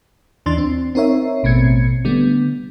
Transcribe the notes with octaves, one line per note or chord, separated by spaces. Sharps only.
D#2 E3 D4 C6 A6
C4
C4 D#4 A#4 C#5 E5
A1 B2 A3 C4 G#6 C#7
D3 G3 A3 B3